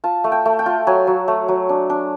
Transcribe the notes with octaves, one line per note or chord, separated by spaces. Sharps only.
F4 A5
A3
G5
A3
G5
F4
F#3 G#5
F#3
A3
F#3
D4
D4